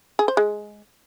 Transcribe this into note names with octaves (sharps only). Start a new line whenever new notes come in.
G#4
C5
G#3